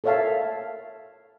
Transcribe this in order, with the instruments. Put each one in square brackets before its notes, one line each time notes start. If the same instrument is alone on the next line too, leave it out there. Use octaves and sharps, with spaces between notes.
[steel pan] A4 A#4 C#5 E5 F5 A5